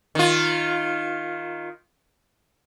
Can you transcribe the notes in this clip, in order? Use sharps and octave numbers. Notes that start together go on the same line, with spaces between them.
D#3 F4